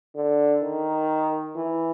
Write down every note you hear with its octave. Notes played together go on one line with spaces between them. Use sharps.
D3
D#3
E3